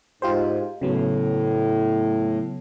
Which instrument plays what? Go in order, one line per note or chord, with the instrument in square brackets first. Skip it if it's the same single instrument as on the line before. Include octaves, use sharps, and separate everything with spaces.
[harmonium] G#2 [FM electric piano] F4 G4 C5
[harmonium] A2 [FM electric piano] C#3 F#3 B3